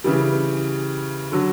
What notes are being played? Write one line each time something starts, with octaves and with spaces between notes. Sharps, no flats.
C#3 E3 G3
D3 F#3